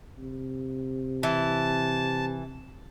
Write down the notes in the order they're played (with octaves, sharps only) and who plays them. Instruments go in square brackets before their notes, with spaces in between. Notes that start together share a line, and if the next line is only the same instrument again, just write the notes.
[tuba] C3
[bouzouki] E3 [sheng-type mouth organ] A5